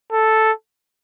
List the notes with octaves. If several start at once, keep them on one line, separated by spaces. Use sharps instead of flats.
A4